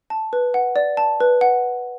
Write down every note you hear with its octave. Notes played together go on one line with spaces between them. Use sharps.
A5
B4
F#5
D5
A5
B4
F#5